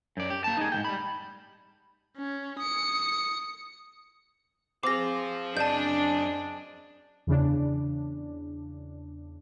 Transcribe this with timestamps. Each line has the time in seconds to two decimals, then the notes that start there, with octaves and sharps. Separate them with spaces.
0.17 F#2 D5
0.30 G4
0.44 A#3 A5
0.57 D#4 G#4
0.72 G#2 F3 G5
0.85 G3 B5
2.18 C#4
2.59 D#6 C#7
4.83 C4 G#4 C5 F5 D6 A#6
5.57 F#2 D4 G#4 D#5 A5 G6
7.27 E2 C#3 D4